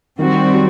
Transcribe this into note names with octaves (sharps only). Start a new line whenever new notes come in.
D#3 G3 C4 F#4
F#3